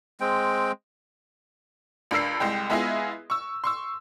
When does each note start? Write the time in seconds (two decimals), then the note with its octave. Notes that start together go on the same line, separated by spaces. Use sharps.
0.20 G#3 C4 G5
2.11 C#2 D4 A#4 E6 C7
2.40 C2 G#3 G5
2.70 G#3 B3 E4 F4 G#4 D#5
3.30 C#6 E6
3.64 C6 C#6 E6